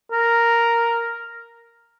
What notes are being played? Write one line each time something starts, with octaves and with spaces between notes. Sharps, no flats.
A#4